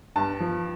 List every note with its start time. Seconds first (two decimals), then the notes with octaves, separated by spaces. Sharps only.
0.16 G2 A5
0.40 F3